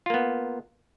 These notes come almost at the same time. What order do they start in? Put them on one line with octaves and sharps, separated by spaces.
F4 A#3 B3